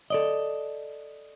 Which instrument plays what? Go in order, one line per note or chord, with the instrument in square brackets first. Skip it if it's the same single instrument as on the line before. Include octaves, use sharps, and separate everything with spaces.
[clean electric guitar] A4 D5 D#5